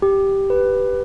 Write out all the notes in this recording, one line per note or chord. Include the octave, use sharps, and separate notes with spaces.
G4
B4